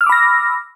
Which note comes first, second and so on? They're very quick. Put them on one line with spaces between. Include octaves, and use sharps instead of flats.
F6 E6 D6 B5 A#6